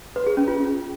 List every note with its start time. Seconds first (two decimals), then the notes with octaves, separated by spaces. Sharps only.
0.16 B4
0.27 G#4
0.37 C#4
0.48 F4